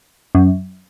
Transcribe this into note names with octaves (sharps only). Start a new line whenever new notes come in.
F#2